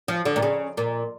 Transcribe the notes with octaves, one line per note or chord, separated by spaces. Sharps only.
F3
D3
A#2
C#3
A#2